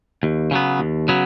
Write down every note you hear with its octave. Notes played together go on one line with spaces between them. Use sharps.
D#2
C#3 F#3 B3
D#2
C#3 F#3 B3